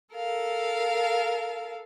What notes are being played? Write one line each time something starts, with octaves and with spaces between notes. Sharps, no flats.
A4 A#4 F5